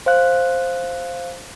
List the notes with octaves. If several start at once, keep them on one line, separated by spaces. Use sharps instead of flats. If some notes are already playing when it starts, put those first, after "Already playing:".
C5 F5 F#6